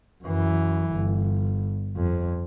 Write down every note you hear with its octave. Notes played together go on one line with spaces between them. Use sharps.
F#2 E3
G1
F2